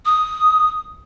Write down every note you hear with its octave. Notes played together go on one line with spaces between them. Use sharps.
D#6